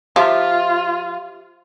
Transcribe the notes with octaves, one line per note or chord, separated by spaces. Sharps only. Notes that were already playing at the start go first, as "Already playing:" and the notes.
F3 F4 G4 E5 A#5